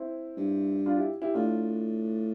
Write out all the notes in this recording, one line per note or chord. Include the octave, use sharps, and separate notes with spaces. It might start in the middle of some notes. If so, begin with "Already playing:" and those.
Already playing: C4 E4
G2
D4 F4
E4 G4
E4 G4
A2 D4 F4